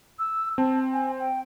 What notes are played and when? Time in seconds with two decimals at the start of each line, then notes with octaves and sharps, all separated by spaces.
0.19 E6
0.58 C4 A5
0.93 G#5
1.20 G5